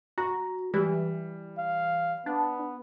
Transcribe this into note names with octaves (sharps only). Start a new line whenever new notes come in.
F#4 A#5
E3 G3
F5
B3 D4